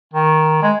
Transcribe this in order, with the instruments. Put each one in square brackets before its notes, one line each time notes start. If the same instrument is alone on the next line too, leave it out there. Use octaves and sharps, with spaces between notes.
[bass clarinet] D#3
G#3